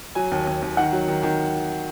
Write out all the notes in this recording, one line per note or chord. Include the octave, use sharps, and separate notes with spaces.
F#3 G#5
D#2
D#2
D#2
D#3 F#5
F#3
D#3
D#3